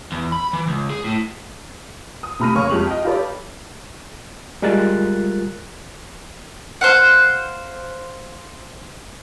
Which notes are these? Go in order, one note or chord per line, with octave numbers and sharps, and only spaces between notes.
E2
B5
E3
C#2
G#4
A2
D#6
C3 A3 B5 F6 A#6 D#7
F1 C#3 A#3 C#5 C#6 F6
F2 G#3 G4 F7 F#7
D#5 G5
F4 G4 A4 B4 C#5 D5
G3 G#3 F4 A#4 F#6 A6
C5 F5 F#5